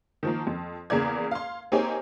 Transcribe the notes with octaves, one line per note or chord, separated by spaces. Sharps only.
D#3 F3 A#3
F2
E2 C#3 A#3 G#4 D5 G#6
F5 C6
A#3 C4 D#4 G4 C#5 G#5